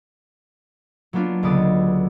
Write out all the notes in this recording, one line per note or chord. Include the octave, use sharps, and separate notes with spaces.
F#3 A#3 B3 D4 F4
C#2 D3 B3 D5 D#6